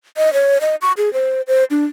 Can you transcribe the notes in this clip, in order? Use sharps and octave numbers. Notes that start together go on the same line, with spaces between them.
D#5
C#5
D#5
C#6
G#4
C5
C5
D4